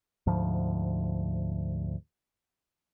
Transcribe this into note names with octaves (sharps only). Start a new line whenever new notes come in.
D2 G#2 F3